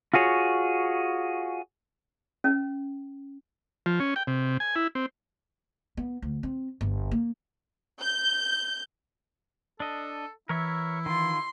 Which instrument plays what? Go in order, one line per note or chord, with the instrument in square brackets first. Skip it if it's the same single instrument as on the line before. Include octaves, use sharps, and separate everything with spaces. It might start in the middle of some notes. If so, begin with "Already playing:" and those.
[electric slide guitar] F4 F#4 G#4 C#5
[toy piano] C#4
[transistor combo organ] F3
C#4
G5
C3
G#5
E4
C4
[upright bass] B3
D2
C4
G1
A#3
[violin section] G6
[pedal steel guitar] D4 D#5 [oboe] A4
[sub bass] E3 [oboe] E4 [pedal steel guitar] A#4 C#5 E5
[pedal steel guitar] D#3 F4 [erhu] C6